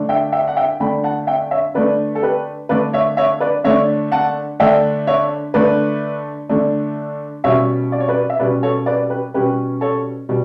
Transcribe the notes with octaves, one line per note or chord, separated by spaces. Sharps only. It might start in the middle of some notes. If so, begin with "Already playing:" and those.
Already playing: D3 A3 D4
E5 G5
E5 G5
F#5
E5 G5
D3 A3 D4 G5 B5
F#5 A5
E5 G5
C#5 E5
D3 A3 D4 B4 D5
A4
G4 B4
D3 A3 D4 B4 D5
C#5 E5
C#5 E5
B4 D5
D3 A3 D4 C#5 E5
F#5 A5
D3 A3 D4 E5 G5
C#5 E5
D3 A3 D4 B4 D5
D3 A3 D4
B2 G3 C#4 C#5 E5
D5
C#5
B4 D5
E5
B2 G3 C#4 B4 D5
A4 C#5
B4 D5
G4 B4
B2 G3 C#4 G4 B4
A4 C#5
B2 G3